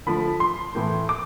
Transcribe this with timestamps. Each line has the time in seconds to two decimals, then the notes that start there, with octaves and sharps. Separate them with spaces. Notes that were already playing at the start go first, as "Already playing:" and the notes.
0.06 D3 F3 A3 B5
0.40 C6
0.75 A2 E3 A3 E4
1.09 D6